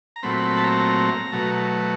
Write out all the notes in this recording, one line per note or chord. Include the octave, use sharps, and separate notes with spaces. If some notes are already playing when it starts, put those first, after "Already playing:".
A#5
A#2 F#3 A3 C4 B5
B5
B5
A5
A#5
B2 F#3 A3